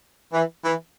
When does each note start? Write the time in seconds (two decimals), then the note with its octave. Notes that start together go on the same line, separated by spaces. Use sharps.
0.33 E3
0.64 E3